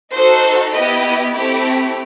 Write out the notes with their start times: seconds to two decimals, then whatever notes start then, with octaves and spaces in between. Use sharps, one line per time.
0.14 D#4 F#4 A4 C5
0.73 B3 E4 G4 D#5
1.33 A3 C4 E4 G4